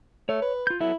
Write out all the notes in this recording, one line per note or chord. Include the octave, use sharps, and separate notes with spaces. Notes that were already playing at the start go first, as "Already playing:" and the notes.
A3 C#5
B4
F4 G6
F#3 B3 E4 A4